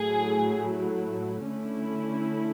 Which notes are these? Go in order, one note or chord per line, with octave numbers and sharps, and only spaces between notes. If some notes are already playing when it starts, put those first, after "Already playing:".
Already playing: A2 F#3 A3 E4 G#4
D3 A3 C#4 E4